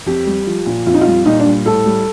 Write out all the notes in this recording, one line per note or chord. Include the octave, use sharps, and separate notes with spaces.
F2 G4
G3
F3
A#2
F2 F4
D#4
F4
G3
A#2 D#4
D4
G3
A2 A4
G3